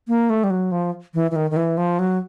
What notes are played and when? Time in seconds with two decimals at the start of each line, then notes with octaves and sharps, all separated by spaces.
0.08 A#3
0.30 A3
0.44 G3
0.50 F#3
0.72 F3
1.14 E3
1.31 E3
1.36 D#3
1.51 D#3
1.56 E3
1.77 F3
1.99 F#3